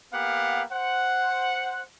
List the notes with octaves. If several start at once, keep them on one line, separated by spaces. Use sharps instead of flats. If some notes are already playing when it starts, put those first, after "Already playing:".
A#3 B3 G4 F5 F#5
C5 F#5